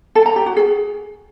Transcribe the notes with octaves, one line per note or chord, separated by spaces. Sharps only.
A4
A#5
G4
F#4
G#4